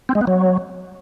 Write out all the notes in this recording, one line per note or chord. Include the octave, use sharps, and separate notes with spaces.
C4
G#3
B3
F#3